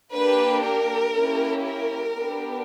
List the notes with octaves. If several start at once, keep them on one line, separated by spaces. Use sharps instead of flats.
A#3 D4 G4 B4
A#4
A#3 C#4 E4 G4
A#4
B3 D4 G4